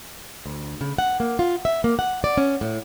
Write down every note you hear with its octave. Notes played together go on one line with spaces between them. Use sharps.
D2
C#3
F#5
A#3
F4
E5
A#3
F#5
D5
C#4
A2